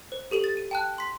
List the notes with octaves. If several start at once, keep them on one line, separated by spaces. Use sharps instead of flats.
C5
G4 A4 D#7 F#7
A6
D#7
G5 A5 F#6
C6 B6